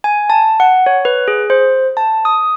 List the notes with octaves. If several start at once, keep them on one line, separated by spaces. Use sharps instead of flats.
G#5
A5
F#5
C#5
B4
G#4
C5
A5
D#6